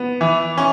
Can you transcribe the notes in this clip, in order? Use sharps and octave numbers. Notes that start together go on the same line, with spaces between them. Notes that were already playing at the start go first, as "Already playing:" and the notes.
Already playing: B3
E3
C#4